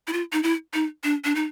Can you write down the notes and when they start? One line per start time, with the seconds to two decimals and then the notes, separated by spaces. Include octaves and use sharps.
0.07 E4
0.13 F4
0.33 D#4
0.43 E4
0.74 D#4
1.04 D4
1.25 D4
1.35 D#4